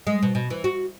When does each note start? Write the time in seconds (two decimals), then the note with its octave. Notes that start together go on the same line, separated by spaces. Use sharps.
0.07 G#3
0.23 B2
0.35 B2
0.50 E3
0.64 F#4